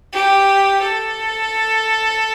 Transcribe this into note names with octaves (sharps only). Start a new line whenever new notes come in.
G4
A4